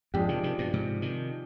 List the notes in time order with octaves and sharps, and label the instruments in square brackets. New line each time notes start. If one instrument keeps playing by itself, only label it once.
[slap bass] F2 G#2 [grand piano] F3 G#3 D4 G4
[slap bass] C3 D#3
C3 D#3
G2 B2
G#2 C3
C3 D#3